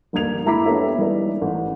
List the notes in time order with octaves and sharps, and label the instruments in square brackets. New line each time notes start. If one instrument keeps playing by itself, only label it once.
[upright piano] G1 D#2 G3 A#3 G#6 F7
G#3 E4 A#5 B5 D6 B6
B3 D4 G4 A4 C#5 E5
E3 G3 G#3 D#4 B4 D5
A1